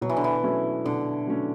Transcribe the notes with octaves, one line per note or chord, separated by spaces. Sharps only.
B2 F#3
E3
D3
E3
F#3 A3 C#4 E4
B2 D3
F#3 A3 C#4 E4